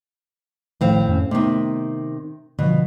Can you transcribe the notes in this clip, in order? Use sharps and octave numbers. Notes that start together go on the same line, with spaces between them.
A1 A2 D#3 F3 C4 F5
F2 B3 C#4
C3 D#3 A3 B3
B2 D3 F3